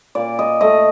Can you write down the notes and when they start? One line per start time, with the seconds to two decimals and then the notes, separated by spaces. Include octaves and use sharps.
0.15 A#2 D5
0.39 D#5
0.61 A3 D#5